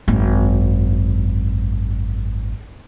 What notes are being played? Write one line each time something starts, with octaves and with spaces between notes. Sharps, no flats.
G#1 F#2